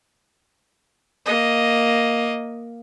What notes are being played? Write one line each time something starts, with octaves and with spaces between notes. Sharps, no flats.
A#3 D#5